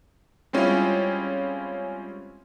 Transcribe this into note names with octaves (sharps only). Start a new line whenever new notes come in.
G3 G#3 C4 C#4 E4 F4